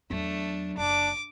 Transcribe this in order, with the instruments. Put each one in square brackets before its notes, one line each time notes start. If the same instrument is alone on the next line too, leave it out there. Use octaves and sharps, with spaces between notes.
[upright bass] E2 F#3 [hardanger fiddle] A3 D4
[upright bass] F#1 [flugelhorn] D4 [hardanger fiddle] D6